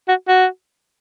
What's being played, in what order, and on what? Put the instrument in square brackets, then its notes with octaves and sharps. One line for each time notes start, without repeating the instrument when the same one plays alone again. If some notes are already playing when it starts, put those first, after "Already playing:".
[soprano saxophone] F#4
F#4